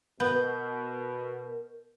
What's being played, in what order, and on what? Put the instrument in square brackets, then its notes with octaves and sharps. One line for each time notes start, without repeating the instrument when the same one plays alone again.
[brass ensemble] B2 [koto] B3 [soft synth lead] A#4 [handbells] G6